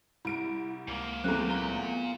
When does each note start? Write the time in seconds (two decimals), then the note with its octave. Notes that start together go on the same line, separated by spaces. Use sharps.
0.25 C2 E4 D7
0.87 C#2 G#2 A#3
1.24 E2 F#3 A3 C4 F#6
1.50 F4 A#4 A#5
1.79 B3